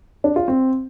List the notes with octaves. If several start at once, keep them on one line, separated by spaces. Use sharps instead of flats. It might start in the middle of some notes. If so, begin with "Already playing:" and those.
D4
F4
C4